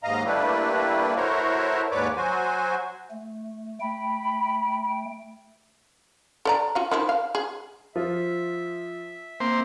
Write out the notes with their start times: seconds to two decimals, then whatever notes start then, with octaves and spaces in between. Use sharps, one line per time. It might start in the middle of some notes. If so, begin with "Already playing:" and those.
0.03 D#2 G#2 D#5 F5 A#5
0.25 G3 A3 A#3 D4 E4 B4
1.16 A3 E4 F#4 A#4 C5 C#5
1.91 D#2 G#2 B4 C#5 D5 D6
2.16 F#3 F#4 C5 G#5
3.11 A3
3.81 A3 G5 B5
6.45 A4 D5 A#5
6.75 F4 F#4 F5
6.91 D#3 F3 E4
7.09 F5
7.35 G#4
7.96 F3 F4 E5
9.40 A#3 C4 C5